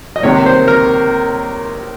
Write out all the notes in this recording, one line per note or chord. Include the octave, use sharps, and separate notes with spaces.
D#5
C#2 C3 D#3 A#3 C#5
C5
A#4